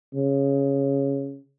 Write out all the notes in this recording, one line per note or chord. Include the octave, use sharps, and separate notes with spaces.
C#3